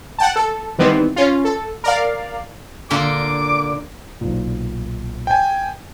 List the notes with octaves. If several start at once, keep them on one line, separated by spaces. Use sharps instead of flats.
F#5 G5 A5
A4
D#3 E3 G3 B3 C4
C#4 F4
A4
A#4 D5 F5
A#2 D3 A#3 D6
B1 A#2
G5 G#5